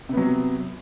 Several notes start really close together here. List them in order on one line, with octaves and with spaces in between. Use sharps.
C3 B3 F#3